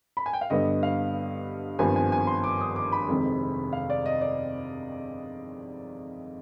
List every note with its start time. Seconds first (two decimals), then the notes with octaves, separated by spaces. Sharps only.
0.17 B5
0.26 G#5
0.33 G5
0.41 F5
0.50 G2 D3 G3 B3 D#5
0.83 F5
1.79 G#1 G2 F3 B3 G#5
1.96 G#5
2.12 G#5
2.27 C6
2.44 D6
2.61 D#6
2.76 D6
2.92 B5
3.08 F1 F2 C3 D#3 G#3
3.73 F5
3.90 D5
4.06 D#5
4.21 D5